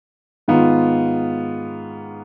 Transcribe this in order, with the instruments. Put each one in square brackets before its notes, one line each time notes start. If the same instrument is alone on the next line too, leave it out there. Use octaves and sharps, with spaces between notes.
[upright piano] G#2 D#3 B3 F4